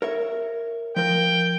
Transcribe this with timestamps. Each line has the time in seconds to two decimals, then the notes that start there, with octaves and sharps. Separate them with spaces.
0.02 A#4 C#5 E5
0.96 F3 A#4 G5